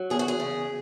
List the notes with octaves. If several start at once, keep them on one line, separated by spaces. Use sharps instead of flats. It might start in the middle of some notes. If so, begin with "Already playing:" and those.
Already playing: F#3
E2 G#4
F#4
G#4
C#3